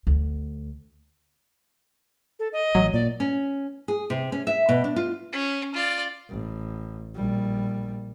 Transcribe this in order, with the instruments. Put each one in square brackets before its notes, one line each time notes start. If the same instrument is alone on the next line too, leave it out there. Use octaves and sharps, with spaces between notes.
[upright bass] D2
[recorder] A4
D#5
[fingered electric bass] A1 [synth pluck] F#3
[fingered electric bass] A#2 [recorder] D5
[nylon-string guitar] C#4
G#4
C3
C#4
E5
B2
D4
F4
[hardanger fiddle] C#4
F4 D5
[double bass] A1
A#1 G3